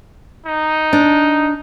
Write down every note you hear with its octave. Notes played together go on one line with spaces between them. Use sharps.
D#4
D4